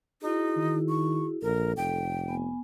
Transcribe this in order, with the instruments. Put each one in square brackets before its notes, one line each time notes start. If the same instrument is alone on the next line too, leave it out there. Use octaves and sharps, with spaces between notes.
[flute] D#4 [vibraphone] E4 F#4 G#4
[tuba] D#3
[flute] C#6
[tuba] A#1 [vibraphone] A4 [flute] A#4
[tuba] F1 [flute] G5
[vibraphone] B3 G#5